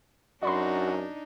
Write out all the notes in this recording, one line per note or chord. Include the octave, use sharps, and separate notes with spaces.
F#2 D4 D#4 F#4 D5 B5 C6